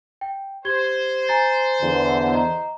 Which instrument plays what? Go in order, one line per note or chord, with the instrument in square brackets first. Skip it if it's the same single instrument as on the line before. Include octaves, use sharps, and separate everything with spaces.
[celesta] G5
[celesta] G4 G#6 G7 [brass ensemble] C5
[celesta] G#5 A#5 A6
[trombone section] E2 D3
[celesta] D#5 A#5